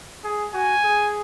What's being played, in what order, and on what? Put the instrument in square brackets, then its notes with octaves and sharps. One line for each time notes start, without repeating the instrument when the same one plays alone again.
[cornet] G#4
[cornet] F#4 [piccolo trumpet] G#5
[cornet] G#4